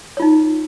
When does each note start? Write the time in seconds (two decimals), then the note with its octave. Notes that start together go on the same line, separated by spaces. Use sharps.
0.17 C#5
0.20 F4
0.22 D#4